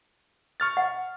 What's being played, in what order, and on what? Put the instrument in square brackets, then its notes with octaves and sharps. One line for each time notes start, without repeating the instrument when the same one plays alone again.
[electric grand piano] C#6 F6 A6
[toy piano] F#5